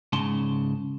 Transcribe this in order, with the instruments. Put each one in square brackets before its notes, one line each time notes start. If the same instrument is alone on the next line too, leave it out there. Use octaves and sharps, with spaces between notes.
[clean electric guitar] G#2 C#3 A5 C6